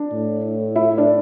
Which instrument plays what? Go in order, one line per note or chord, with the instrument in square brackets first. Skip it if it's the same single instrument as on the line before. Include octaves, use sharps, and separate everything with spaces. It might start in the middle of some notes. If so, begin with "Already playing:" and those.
Already playing: [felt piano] D4 D5
[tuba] A2
[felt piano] E4 E5
D4 D5